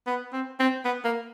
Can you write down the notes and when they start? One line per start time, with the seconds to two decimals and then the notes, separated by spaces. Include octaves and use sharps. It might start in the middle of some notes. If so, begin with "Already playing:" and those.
0.07 B3
0.33 C4
0.59 C4
0.85 B3
1.04 A#3